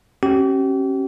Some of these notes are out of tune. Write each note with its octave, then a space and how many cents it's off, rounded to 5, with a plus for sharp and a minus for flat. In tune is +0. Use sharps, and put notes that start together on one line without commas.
C#4 -30 G4 -40